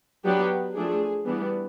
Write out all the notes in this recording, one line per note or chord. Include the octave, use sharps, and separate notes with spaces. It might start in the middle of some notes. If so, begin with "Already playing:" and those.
F#3 B3 D4 G4
F3 A3 D4 G#4
E3 G3 B3 D4